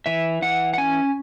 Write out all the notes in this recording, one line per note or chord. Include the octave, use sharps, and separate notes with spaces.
E3 E5
E3 F#5
F#5
C#4 G#5